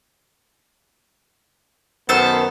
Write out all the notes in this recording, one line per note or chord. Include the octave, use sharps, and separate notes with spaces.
F#2 D#3 B3 A4 C5 F6